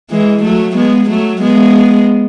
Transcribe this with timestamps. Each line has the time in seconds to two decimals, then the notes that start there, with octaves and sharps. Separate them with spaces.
0.11 E3 G#3
0.43 F#3 A3
0.76 G#3 B3
1.09 F#3 A3
1.41 G#3 B3